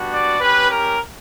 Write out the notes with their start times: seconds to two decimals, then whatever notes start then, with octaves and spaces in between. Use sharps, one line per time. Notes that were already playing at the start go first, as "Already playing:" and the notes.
Already playing: G3 B3 D4 F#4
0.09 D5
0.39 C#4 G4 B4
0.69 A#4